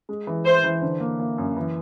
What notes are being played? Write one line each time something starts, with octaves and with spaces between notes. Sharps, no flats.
G#3
E3
E4 C5
E3
D3
A#3
A#3
F#2
E3